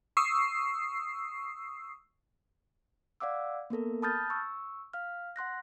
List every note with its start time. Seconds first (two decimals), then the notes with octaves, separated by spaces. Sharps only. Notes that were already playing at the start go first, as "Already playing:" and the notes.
0.17 C#6 D#6 E6 C7
3.20 D5 F5 F#5 D6 E6
3.70 A#3 B3 A4 A#4
4.02 A5 B5 D#6 F6 G6 A6
4.30 C#6 E6
4.93 F5 F6
5.36 F#5 C6 F#6 A#6